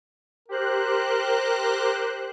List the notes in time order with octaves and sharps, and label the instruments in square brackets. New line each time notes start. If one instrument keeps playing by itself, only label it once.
[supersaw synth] G4 C5 F#6 [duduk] A#4